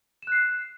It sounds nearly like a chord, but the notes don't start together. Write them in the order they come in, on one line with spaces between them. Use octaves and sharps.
E7 F#6 C7